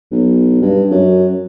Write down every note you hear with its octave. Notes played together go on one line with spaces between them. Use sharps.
B1
G2
F#2